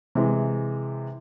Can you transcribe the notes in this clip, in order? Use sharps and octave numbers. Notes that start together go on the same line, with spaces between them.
C3 E3 G#3